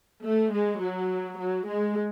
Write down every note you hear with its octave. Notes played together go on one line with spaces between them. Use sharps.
A3
G#3
F#3
F#3
G#3